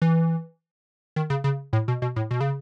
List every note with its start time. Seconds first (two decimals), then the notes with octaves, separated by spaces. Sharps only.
0.02 E3
1.16 D#3
1.30 C#3
1.44 C#3
1.73 A2
1.88 B2
2.02 B2
2.16 A2
2.31 B2
2.41 C#3